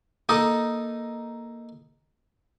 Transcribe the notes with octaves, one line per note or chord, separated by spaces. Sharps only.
A#3 D#4 A4 D#5